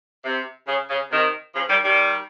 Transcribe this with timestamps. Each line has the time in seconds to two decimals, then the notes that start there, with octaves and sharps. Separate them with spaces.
0.25 C3
0.68 C#3
0.90 C#3
1.11 C3 D#3
1.55 C#3 F3
1.69 D#3 G3
1.83 D#3 G3